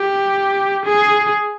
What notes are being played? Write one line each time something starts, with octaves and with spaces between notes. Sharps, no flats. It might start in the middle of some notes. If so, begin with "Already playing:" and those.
Already playing: G4
G#4